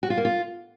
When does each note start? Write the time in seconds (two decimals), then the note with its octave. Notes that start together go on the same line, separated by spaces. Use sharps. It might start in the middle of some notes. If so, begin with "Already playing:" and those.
0.03 F#4
0.10 F4
0.17 A#3
0.25 F4